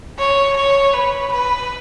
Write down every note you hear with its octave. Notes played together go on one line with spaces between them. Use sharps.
C#5
C#5
B4
B4